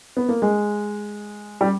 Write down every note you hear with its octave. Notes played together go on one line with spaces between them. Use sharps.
B3
A#3
G#3
G3